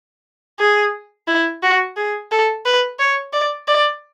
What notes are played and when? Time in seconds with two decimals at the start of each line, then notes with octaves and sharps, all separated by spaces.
0.59 G#4
1.28 E4
1.63 F#4
1.97 G#4
2.31 A4
2.66 B4
2.99 C#5
3.33 D5
3.68 D5